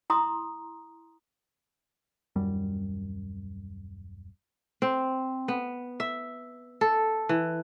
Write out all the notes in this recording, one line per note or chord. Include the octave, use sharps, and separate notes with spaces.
E4 A#5 C6 D#6
D#1 F#2 G3
C4
B3
E5
A4
E3